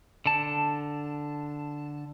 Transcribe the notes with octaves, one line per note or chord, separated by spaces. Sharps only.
D3 A5